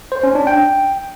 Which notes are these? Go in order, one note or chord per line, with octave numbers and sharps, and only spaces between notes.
C5
C#4
D4
G5